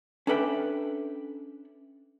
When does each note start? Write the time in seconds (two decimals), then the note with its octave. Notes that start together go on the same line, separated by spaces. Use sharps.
0.27 C#4 D4 A4 B4 E5 G5